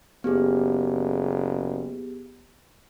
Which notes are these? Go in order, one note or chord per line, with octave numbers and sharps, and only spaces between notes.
F#1 B3 G4 G#4